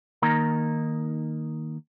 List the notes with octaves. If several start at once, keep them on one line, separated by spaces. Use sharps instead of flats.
D#3 A#3 D#4 A#5